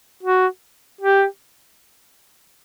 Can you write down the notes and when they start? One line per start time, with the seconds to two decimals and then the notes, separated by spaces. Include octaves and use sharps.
0.23 F#4
1.01 G4